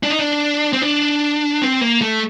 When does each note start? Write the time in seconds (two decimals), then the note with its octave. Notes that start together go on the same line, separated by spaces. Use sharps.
0.03 D4
0.10 D#4
0.19 D4
0.73 C4
0.82 D4
1.62 C4
1.81 A#3
2.01 A3